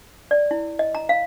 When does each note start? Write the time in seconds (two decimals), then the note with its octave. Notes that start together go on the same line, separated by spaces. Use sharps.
0.31 D5
0.51 E4
0.79 D#5
0.95 A#5
1.09 F5